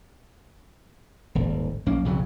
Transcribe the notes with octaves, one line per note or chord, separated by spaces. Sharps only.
D#1 G#1
A#1 F#2 A#3 C#4
B1 F2 C#3 F#3